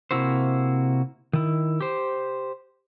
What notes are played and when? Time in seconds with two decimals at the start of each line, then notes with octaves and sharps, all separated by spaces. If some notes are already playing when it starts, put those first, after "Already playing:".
0.11 C3 A#3 E4 F#4 C5
1.33 D#3 E4
1.81 G4 C5